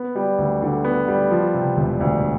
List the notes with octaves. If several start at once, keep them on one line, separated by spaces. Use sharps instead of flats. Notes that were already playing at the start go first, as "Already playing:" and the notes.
Already playing: B3
G3
D2
D3
B3
G3
F3
C3
E1
D2